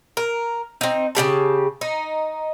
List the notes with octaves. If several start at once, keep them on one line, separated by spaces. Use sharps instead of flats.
A#4
C4 D#4
C#3 C4 G4 A5
D#4